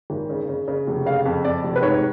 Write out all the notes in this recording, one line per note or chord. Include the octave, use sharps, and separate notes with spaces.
G#1
C#3
C#3
C#3
F1
C#3 F5
F2
F2 D5
F1
B4
G#2 C#5